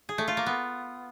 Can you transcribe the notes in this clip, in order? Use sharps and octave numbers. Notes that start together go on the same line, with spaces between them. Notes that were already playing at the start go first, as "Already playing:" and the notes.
G#4
A3
F4
A#3
B3